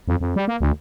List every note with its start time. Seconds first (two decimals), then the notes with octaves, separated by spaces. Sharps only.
0.08 F2
0.20 F2
0.36 G3
0.48 A#3
0.61 D2